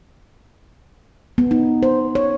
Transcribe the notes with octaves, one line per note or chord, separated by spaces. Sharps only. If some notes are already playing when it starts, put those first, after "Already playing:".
B3
D#4
C5
C#5